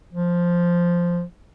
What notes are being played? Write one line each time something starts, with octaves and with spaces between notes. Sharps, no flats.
F3